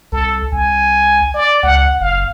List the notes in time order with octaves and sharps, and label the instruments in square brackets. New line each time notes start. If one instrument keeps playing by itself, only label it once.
[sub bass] C2 [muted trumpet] A4
[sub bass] C2 [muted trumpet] G#5
[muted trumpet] D5
[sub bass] C#2 [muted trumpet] F#5
[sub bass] F#1 [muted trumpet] F5